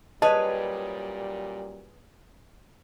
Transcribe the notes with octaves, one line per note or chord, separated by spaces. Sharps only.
F#2 A#2 G3 G#4 B4 C#5 D#5 A5